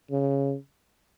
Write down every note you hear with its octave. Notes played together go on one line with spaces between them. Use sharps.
C#3